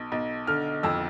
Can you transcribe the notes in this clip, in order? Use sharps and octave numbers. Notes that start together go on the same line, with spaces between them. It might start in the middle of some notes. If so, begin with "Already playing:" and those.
Already playing: B1
B1
D3 F6
F2 E6